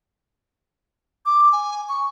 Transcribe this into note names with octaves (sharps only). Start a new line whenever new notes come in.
D6
G#5
C#6